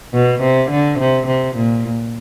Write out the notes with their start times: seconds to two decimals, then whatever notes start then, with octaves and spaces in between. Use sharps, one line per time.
0.13 B2
0.42 C3
0.70 D3
0.99 C3
1.27 C3
1.56 A#2